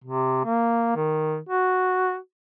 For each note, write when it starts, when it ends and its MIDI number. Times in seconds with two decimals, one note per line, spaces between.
0.04 0.41 48
0.45 0.91 58
0.96 1.37 51
1.49 2.16 66